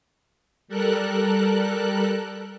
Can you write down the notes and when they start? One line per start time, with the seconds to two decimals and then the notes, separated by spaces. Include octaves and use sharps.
0.68 G3 A4 A#4 F#6